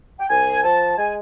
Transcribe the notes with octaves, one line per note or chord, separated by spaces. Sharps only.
G5
C2 G#5
F3 A5
G#3 G#5